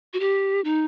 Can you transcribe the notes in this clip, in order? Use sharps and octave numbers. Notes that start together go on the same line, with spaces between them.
F#4
G4
D#4